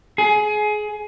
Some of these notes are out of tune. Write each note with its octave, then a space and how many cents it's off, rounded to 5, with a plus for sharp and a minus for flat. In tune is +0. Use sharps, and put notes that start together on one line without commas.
G#4 +20